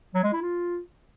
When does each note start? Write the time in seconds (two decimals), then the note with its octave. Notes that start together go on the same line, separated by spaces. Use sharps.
0.14 F#3
0.24 G#3
0.33 E4
0.42 F4